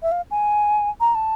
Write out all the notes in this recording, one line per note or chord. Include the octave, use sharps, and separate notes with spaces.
E5
F5
G#5
A#5
A5